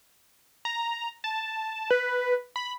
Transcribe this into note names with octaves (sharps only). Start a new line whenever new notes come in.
A#5
A5
B4
B5